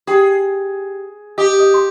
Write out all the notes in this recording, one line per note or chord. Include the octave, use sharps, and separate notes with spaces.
G4 G#4 G5
G4 D#5 D#6
D#5 D#6
C6